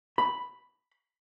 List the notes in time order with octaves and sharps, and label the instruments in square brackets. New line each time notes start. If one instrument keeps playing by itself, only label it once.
[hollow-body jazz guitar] B5